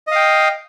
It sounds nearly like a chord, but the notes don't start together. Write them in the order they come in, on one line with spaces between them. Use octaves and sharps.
D#5 F5 G5